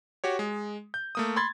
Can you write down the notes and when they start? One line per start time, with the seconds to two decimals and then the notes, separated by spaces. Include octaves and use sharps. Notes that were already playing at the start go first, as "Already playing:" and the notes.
0.24 F#4 G4 C#5
0.39 G#3
0.94 G6
1.15 A3 A#3 D#6
1.36 B5 C6 G#6 A6